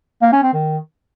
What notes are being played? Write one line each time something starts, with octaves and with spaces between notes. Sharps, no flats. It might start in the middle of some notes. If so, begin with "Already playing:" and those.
A#3
C#4
C4
D#3